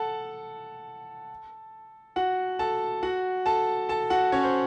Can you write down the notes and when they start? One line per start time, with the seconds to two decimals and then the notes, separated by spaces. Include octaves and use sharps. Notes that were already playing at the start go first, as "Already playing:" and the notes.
Already playing: A4 F#5 A5
2.16 F#4 F#5
2.59 A4 A5
3.03 F#4 F#5
3.46 A4 A5
3.89 A4 A5
4.10 F#4 F#5
4.32 C#4 C#5
4.43 C5